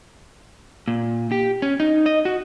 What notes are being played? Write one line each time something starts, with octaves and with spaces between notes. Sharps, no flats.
A#2
G4
C#4
D#4
D#5
F#4